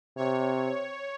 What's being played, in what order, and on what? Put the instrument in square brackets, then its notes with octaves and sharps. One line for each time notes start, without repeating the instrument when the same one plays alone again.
[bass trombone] C3 [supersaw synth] C#5